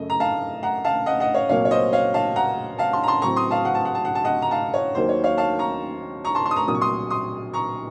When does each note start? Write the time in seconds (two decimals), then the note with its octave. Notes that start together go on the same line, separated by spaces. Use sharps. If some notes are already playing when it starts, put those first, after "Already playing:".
Already playing: F#2 C#3 A3 D#5
0.10 A#5
0.20 F5 A5
0.63 F#5 A#5
0.85 F5 A5
1.06 D#5 F#5
1.20 D#5 F#5
1.34 C#5 F5
1.49 C2 A#2 F#3 A#3 C#5 F5
1.65 C#5
1.71 C5 D#5
1.93 C#5 F5
2.14 F5 A5
2.36 F#5 A#5
2.79 F5 A5
2.93 A5 C6
3.03 A#5
3.07 A5 C6
3.22 A2 F#3 C4 A#5 C#6
3.36 C6 D#6
3.51 F5 A5
3.65 F#5
3.75 A5
3.85 F#5
3.95 A5
4.05 F#5
4.15 A5
4.24 D#5 F#5
4.42 A#5
4.51 F5 A5
4.74 C#5
4.95 D#2 D#3 F#3 A#3 C5
5.09 C#5
5.24 C#5 F5
5.38 F5 A5
5.59 A#5 C#6
6.25 A#5 C#6
6.35 A5 C6
6.45 A5 C6
6.51 D#6
6.56 A#5 C#6
6.67 C2 A#2 F#3 A#3 D#6
6.75 C#6
6.81 C6 D#6
7.10 C6 D#6
7.54 A#5 C#6